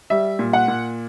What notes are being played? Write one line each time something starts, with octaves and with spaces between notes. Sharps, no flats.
G3 E5
A#2
F#5
A#2